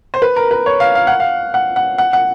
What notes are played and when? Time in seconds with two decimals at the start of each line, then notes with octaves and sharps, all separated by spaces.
0.14 C5
0.22 B4
0.36 A#4
0.51 B4
0.66 C#5
0.80 F5
0.95 F5
1.07 F#5
1.20 F5
1.54 F#5
1.76 F#5
1.98 F#5
2.13 F#5